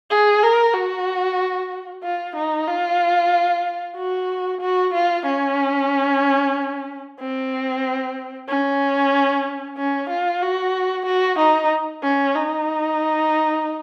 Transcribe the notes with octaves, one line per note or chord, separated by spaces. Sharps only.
G#4
A#4
F#4
F4
D#4
F4
F#4
F#4
F4
C#4
C4
C#4
C#4
F4
F#4
F#4
D#4
C#4
D#4